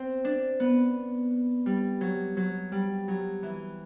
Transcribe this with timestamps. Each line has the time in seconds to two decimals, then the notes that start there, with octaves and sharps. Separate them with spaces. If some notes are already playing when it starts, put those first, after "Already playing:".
Already playing: C4
0.25 D4
0.60 B3
1.66 G3
2.01 F#3
2.37 F#3
2.72 G3
3.08 F#3
3.43 E3